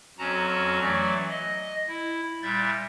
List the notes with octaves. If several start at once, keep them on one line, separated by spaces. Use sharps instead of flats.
F2 F#3 C#4 F#4 A5 A#5
E3 F#3 A3 D5
D#5
E4
A#2 G3 E5 G6 A6